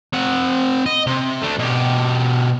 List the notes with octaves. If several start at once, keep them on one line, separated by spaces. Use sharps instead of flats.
C4 F#5
D#5
C3
A3 D4
B2 G4